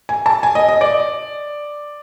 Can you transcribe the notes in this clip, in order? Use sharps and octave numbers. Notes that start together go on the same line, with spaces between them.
G#5
A5
G#5
D#5
D#5
D5